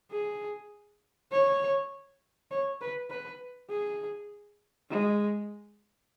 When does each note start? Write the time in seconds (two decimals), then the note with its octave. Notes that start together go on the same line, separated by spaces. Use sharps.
0.11 G#4
1.32 C#5
2.51 C#5
2.81 B4
3.10 B4
3.70 G#4
4.90 G#3